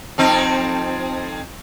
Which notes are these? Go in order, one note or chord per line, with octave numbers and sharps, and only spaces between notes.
F2 C4 D#4